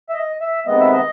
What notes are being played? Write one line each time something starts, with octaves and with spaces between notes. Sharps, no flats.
E5
D#5
E5
C3 D#3 G#3 B3 D#5
E5
D#5